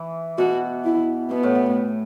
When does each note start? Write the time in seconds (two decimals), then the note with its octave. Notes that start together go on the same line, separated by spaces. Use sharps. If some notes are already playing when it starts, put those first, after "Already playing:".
Already playing: E3
0.38 B2 F#4
0.85 E4
1.31 B2 B3
1.43 A2
1.55 B2
1.66 A2